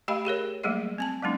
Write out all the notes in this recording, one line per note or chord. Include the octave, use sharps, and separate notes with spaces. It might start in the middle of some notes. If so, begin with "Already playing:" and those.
A3 G4 D#5 F5 G5 B5
G4 G#4 A#4 C#5
F#3 G3 A3 A#3 G#4 D#5
C4 G#5 A5
F#3 G#3 A#3 C#4 D#4